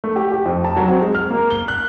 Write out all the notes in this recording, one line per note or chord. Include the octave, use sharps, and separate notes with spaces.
A3
G4
G4
F2
A5
F#3
C4
G#3
F6
A#3
G7
F#6